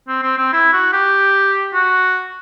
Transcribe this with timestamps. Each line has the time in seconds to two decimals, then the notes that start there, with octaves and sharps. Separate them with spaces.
0.08 C4
0.23 C4
0.38 C4
0.53 E4
0.73 F#4
0.93 G4
1.74 F#4